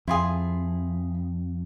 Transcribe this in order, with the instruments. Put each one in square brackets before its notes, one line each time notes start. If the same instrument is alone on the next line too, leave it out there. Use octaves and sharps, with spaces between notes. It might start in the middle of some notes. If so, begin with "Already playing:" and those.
[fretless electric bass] F2 [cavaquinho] E4 F4 G#4